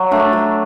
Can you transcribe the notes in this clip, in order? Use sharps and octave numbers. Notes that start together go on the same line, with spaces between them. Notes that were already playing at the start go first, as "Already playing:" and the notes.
Already playing: F#3
A3 D4
F#3